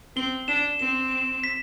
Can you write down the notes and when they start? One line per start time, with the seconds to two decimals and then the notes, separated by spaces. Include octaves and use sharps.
0.16 C4 G7
0.48 D4 E7
0.79 C4 E7
1.11 E7
1.44 B6